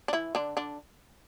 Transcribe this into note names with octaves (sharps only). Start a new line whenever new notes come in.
D4
E3 E4
D3 D4
D3 D4